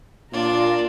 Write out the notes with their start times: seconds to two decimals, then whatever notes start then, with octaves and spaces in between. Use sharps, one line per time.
0.32 A#2 D4 F4 A#4